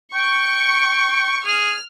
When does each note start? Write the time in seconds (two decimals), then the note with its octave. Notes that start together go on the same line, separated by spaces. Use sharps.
0.15 G5 C#6
1.46 G#4 F6